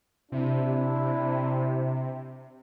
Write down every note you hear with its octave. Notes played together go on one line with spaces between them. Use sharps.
C3 D4 E4